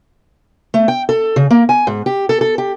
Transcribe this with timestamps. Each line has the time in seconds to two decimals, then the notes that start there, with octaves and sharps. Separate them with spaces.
0.74 A3
0.88 G5
1.09 A4
1.36 C#3
1.51 A#3
1.69 G#5
1.87 G#2
2.06 G4
2.29 A4
2.41 A4
2.58 G4